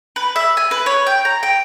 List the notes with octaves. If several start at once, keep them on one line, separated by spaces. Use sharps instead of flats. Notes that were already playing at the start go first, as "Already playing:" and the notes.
B4
E5
G#5
B4
C#5
G5
A#5
G5